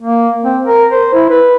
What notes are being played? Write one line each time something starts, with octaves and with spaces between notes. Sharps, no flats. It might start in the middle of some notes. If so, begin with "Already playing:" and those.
A#3
C4
A#4
C5
E4
B4